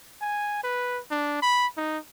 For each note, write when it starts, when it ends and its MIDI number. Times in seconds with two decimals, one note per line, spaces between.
0.21 0.60 80
0.64 1.00 71
1.11 1.41 62
1.42 1.67 83
1.77 1.98 63